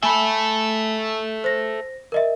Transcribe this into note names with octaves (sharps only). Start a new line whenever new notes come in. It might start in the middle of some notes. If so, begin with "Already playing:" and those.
A4 E5 G#5 B5
C5 A#6
A#4 D#5 E5